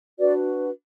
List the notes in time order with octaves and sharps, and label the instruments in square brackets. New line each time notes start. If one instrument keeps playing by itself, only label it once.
[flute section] D4 F#4 B4 D5